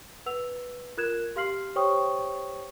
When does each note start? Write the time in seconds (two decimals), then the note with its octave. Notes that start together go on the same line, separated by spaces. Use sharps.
0.26 B4 F#5 E6 F7
0.97 F4 A#4 F#6 G#6 E7
1.36 G4 F5 C6 F6 C7 F#7
1.76 G4 C5 C#5 G5 C#6 D#6